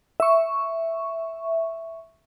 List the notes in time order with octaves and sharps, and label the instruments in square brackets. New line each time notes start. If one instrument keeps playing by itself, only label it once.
[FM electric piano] E5 C#6